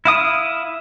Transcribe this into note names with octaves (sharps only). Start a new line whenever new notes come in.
E4 F5 D#6